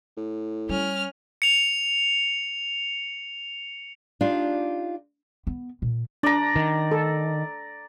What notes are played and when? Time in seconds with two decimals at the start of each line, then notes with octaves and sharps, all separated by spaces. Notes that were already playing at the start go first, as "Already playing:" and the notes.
0.17 A2
0.69 G3 C#4 F6
1.42 C#7 F7
4.21 D4 D#4 F4 G4
5.47 B3
5.82 A#2
6.23 D4 D5 A#5
6.56 D#3
6.92 A4